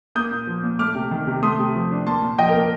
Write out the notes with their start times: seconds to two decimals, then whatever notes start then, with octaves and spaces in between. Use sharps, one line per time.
0.15 A#3 D#6 G6
0.32 A#2
0.47 F3
0.63 A#2
0.79 A3 D6 F6
0.95 C3
1.11 D#3
1.27 C3
1.42 A3 C6 D#6
1.59 C3
1.74 F3
1.91 D4
2.06 A#3 A5 C6
2.22 A#2
2.38 F3 D#5 G5
2.49 A#4
2.55 A#2
2.60 A#4